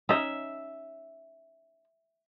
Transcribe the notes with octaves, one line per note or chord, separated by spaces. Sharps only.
C#4 D#4 E5